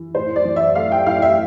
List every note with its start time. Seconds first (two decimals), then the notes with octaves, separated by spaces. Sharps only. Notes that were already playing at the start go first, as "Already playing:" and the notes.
Already playing: E3
0.15 A2 C5
0.36 D5
0.45 E3
0.56 E5
0.75 A3 F5
0.92 G5
1.06 A2 F5
1.22 E5